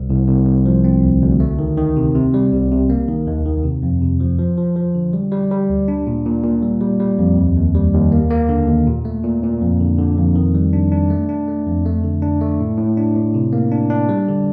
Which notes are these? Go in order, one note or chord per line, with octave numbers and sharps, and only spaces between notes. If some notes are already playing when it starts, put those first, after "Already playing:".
Already playing: C2
C2
C2
C2
F3
C4
D2
D2
A3
D#3
D#3
C3
C3
G3
C2
C3
A#3
D#3
D#2
D#3
C3
F2
C3
F3
F3
F3
F3
D3
G3
G3
G3
D2
D4
A#2
A#2
A#2
G3
G3
G3
F2
D#2
D#2
G3
D#2
A#3
A#3
D3
D#2
A#2
A3
A#2
A#2
F2
D3
D3
F2
D#3
G3
D4
D4
A3
D4
A3
F2
A3
D3
D4
A3
A2
A2
D4
A2
C3
A#3
D4
D4
G3
D3